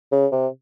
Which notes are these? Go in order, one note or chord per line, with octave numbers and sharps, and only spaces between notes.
C#3
C3